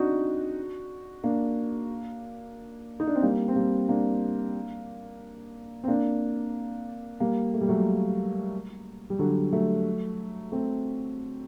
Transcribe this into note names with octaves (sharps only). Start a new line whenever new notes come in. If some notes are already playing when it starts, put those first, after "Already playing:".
Already playing: C4 D4 D#4 F#4
A#3 D4
D#4
D4
C4
G3 A#3
C4
G3 A#3
A#3 D4
C4
A#3 D4
G3 A#3
A3
G3
F#3 A3
G3
D3 F#3
F#3 A3
A3 C4